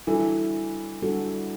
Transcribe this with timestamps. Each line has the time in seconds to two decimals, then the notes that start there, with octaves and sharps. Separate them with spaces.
0.07 E3 G3 D4 F#4 A4
1.02 G3 D4 F#4 A4